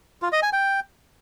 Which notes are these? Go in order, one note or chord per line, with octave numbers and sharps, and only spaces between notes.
F4
D#5
G#5
G5